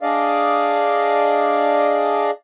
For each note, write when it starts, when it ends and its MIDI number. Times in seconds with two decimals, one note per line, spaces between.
0.01 2.31 62
0.01 2.31 68
0.01 2.31 74
0.01 2.31 75
0.01 2.31 77